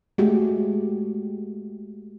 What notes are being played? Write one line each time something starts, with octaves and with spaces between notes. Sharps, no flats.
G#3 A3 F#4 G4